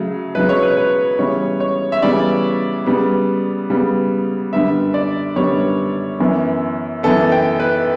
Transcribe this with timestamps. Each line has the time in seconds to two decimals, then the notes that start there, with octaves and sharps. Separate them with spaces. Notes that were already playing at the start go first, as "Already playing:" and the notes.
Already playing: C#3 F#3 A3
0.35 C#3 F#3 A3 B4
0.49 C#5
0.63 B4
0.77 B4
1.19 C#3 E3 G3 B3 C#5
1.60 C#5
1.92 E5
2.02 C#3 E3 G3 B3 D5
2.86 C#3 G3 B3
3.70 C#3 G3 B3
4.53 F#2 D3 G3 B3 E5
4.94 D5
5.36 F#2 D3 G3 B3 C#5
6.20 F#2 E3 B3
7.03 F#2 E3 B3 A4
7.32 G5
7.60 B4